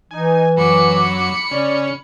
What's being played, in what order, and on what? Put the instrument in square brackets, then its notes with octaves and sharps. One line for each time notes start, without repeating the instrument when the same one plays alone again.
[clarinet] E3 [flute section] D#4 [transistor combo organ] G#5
[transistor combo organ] F#2 F#3 [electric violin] B5 C#7 [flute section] D6
[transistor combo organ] C#3 C#4 [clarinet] D5